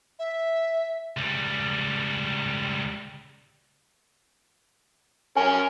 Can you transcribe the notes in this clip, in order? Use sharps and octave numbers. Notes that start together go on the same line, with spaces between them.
E5
C#2 G3
C#4 A#4 G#5